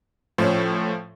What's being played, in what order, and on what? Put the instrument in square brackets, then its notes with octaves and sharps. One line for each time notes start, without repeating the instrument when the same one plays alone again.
[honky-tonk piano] A2 C#4 [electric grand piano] F3